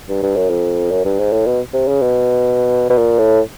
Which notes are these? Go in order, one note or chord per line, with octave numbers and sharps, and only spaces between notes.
G2
G2
F#2
F2
F#2
G2
G#2
A2
B2
C3
C#3
B2
B2
A#2
A2